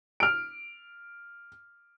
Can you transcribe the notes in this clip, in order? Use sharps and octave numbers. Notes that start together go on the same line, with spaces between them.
F6 D7